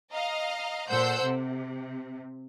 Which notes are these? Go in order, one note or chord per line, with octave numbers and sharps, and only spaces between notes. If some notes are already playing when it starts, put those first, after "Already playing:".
D#5 F5 A#5
A#2 A4 C5 F#5 E6 G6
C3